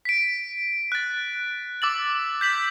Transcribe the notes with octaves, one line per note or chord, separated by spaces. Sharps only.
B6 D7
F#6 A6
D6 E6 A6 F#7
G6 B6 F#7